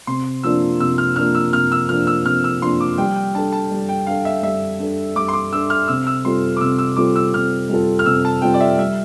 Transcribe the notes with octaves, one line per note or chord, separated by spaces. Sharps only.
C3 C6
F3 A#3 D4 E6
C3 E6
F6
F3 A#3 D4 F6
E6
C3 F6
E6
F3 A#3 D4 F6
E6
C3 F6
E6
F3 A#3 D4 C6
D6
G3 G5
G5
D4 A4 A5
A5
G3
G5
D4 A4 F5
E5
G3 E5
D4 A4
G3 D6
C6
D6
D4 A4 E6
F6
C3 E6
E6
G3 C4 F4 A4 C6
D6
C3 E6
E6
G3 C4 F4 A4 D6
E6
C3 F6
G3 C4 F4 A4
F6
C3 E6
A5
G3 C4 F4 A4 G5
D5
E5
G3 E5